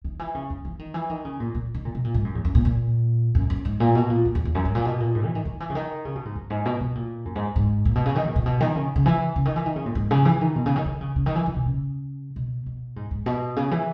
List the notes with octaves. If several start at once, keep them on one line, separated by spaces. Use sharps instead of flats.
D#3
E3
C#3
F#2
E3
D#3
E3
D#3
C#3
A#2
A#2
D#3
A#2
B2
A#2
G#2
F#2
E2
F#2
A#2
A#2
F#2
F#2
G#2
A#2
B2
A#2
F#2
E2
E2
F#2
G#2
A#2
B2
A#2
G#2
E3
D#3
D#3
E3
C#3
D#3
C#3
B2
G#2
F#2
G#2
B2
B2
A#2
F#2
G#2
G#2
A#2
B2
C#3
D#3
B2
A#2
B2
D#3
C#3
C#3
E3
C#3
D#3
E3
D#3
C#3
A#2
G#2
C#3
E3
D#3
B2
C#3
D#3
D#3
C#3
C#3
D#3
E3
D#3
B2
C#3
B2
B2
G#2
G#2
B2
C#3
E3